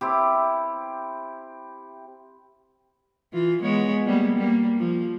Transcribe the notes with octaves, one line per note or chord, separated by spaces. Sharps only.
C4 E4 G4
E3 F4
G#3 B3 C#5
G3 A#3 B3
G3 A#3
F3